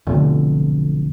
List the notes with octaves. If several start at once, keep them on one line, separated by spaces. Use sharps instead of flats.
F1 B1 F2 D3